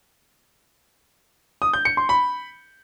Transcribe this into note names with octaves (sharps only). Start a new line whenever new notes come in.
D#6
G6
C#7
C6
B5